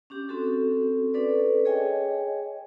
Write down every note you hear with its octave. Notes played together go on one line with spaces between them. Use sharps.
C#4 D4 G4
C4 C#4 F#4 A4
C#4 D4 A4 B4 D5
G#4 C#5 D#5 G5 G#5